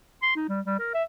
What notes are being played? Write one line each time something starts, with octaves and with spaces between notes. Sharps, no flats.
C6
D#4
G3
G3
A#4
E5